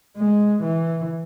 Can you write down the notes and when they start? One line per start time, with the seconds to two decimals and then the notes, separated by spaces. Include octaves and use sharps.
0.17 G#3
0.63 E3